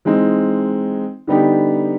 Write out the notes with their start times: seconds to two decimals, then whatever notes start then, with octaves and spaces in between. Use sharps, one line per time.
0.05 E3 G#3 C4 D#4
1.27 D3 G3 B3 D#4 G4